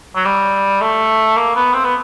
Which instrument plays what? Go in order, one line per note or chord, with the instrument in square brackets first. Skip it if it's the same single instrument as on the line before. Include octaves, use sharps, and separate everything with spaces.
[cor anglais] F#3
G3
A3
A#3
B3
C4
B3